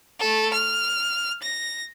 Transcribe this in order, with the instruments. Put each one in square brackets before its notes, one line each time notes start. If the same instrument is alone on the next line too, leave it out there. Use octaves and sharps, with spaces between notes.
[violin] A3 A4
F6
A#6